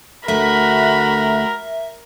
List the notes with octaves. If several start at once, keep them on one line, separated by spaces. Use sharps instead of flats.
D2 D3 A3 F#4 A#4 E5 B5